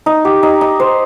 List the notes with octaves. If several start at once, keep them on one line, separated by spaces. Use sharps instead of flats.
D#4
G4
D#4
D#4
C5